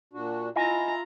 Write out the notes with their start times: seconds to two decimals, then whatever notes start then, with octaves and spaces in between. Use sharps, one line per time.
0.13 A#2 D4 F#4
0.56 E4 F4 D#5 G#5 A#5